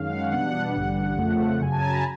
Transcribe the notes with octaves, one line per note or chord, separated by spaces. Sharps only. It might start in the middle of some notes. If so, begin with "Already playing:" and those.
Already playing: F#2 D#3 G#3 C#4 F5
F#5
E2 B2 G3 B3 D4 F#5
A1 G2 D3 G3
F2 C#3 F3 A3
F#2 C#3 F#3 G#5
A5
A#5
B5